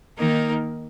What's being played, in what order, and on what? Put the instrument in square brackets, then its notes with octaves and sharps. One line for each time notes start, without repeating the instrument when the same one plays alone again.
[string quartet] D#3 A#3 D#4 A#4